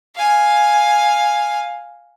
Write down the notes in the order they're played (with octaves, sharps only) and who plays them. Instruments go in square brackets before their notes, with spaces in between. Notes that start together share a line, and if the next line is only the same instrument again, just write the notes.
[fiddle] F5 G#5